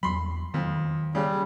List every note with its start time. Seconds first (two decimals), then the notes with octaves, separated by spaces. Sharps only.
0.03 E2 F#3 B5 C6
0.54 F2 D#3 F#3
1.15 C#3 G3